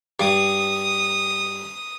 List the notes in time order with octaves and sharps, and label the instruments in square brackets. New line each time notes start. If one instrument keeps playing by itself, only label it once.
[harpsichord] G2 [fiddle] D#6